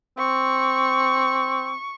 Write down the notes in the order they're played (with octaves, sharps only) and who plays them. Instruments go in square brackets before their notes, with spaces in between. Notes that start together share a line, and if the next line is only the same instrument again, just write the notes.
[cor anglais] C4 [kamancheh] C#6